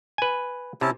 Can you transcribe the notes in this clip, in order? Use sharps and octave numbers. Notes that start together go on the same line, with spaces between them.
B4 G#5
C3 C#4 E4 A5